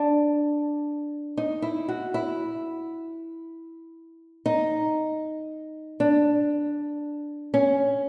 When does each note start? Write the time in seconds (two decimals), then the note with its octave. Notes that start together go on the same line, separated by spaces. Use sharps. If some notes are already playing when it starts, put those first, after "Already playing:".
Already playing: D4
1.37 D#4
1.62 E4
1.88 F#4
2.14 E4
4.46 D#4
6.00 D4
7.54 C#4